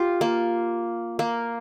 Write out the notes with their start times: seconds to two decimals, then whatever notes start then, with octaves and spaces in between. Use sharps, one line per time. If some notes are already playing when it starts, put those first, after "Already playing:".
Already playing: F4 G4
0.21 A#3
1.19 A#3